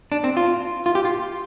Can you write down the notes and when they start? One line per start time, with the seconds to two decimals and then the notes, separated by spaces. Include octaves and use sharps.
0.12 D4
0.24 C4
0.37 F4
0.86 F4
0.95 G4
1.05 F4